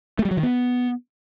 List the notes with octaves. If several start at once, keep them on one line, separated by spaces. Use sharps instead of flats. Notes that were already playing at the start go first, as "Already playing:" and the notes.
A3
G3
F#3
D#3
B3